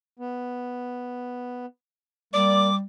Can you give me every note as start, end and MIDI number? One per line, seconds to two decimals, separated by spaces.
0.19 1.66 59
2.34 2.85 55
2.34 2.70 58
2.34 2.66 74
2.34 2.75 86